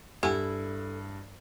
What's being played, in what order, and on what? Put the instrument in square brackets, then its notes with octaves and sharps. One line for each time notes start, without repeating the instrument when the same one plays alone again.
[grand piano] G2 [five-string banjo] E4 [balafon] G4 F#5 G#5 [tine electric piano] A4